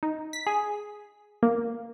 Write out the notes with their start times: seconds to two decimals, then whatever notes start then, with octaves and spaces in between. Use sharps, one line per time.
0.03 D#4
0.33 B6
0.47 G#4
1.43 A#3